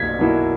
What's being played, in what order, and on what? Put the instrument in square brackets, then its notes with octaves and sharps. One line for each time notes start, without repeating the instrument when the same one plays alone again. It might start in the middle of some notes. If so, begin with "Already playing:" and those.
Already playing: [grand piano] B1 [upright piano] G#6 B6
[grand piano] B2 F#3 A#3 E4